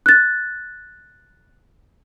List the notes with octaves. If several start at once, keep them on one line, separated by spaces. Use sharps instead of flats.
F#6 A6